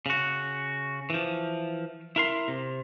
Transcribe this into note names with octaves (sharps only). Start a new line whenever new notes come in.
C#3 F#4
E3 F3
E4 A#4 C6
C3